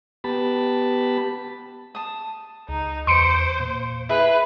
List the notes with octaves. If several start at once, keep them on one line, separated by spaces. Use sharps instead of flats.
B3 G4 A5 B5
A5 D#6
C#2 D#4
E2 C5 C6 C#7 D7
A#2
E4 G#4 B4 E5